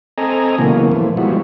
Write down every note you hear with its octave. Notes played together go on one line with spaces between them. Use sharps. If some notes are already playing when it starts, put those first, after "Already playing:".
C4 A4 D#5 G#5 A#5
A#2 C#3 E3 F#3 A#3 B3
A#2 E3 F3 A3
F3 G3 G#3 B3 E4 F#4